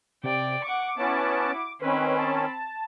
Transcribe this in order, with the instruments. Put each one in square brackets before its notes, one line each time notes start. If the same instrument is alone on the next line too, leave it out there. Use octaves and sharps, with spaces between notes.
[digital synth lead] C3 [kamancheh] D5 G5
[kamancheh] F#5 C#6 [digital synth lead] D6
[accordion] B3 C#4 A5 [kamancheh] E4 F#4
[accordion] D#3 C#4 [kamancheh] C4 B5 [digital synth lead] B4
[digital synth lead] A5